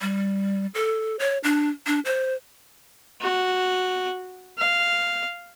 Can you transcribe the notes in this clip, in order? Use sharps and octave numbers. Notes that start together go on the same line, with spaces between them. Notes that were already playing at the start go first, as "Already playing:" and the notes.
G3
A4
C#5
D4
D4
C5
F#4
F5